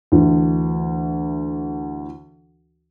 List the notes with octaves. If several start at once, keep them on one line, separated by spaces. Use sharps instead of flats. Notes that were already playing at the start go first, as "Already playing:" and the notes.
D2 E3